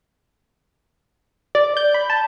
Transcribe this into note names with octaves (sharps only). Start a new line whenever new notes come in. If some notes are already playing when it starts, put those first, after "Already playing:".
D5
G6
B5
A5